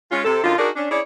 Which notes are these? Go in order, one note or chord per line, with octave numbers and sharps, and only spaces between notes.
G#3 C#4 F4
C3 A4
F#2 D3 D#4 F4
D4 D#4 F#4 G#4 A#4 D5
C#4 D4
C#4 E4 G#4 C#5 D5